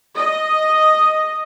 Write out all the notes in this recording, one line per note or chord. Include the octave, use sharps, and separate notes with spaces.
D#5